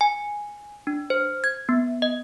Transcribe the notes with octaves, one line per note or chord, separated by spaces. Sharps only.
G#5
D4
C5
G#6
B3
D#5